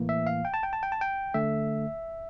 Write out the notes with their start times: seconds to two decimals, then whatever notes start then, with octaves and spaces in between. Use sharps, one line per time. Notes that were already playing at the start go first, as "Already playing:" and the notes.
Already playing: A2 E3 A#3
0.09 E5
0.27 F5
0.45 G5
0.54 A5
0.63 G5
0.73 A5
0.83 G5
0.92 A5
1.01 G5
1.34 D3 A3 E5